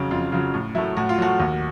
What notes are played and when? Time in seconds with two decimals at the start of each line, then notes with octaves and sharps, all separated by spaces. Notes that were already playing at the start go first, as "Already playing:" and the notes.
Already playing: F2 C#3 F#3
0.11 F2 F4
0.32 C#3 F#3 F4
0.54 A2
0.75 F#3 A3 E4
0.97 A2 F#4
1.09 F4
1.18 F#3 A3 F#4
1.39 D#2